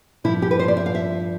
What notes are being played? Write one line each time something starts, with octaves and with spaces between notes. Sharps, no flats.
G2 F3 E4
G4
B4
C5
D5
E5
F5
E5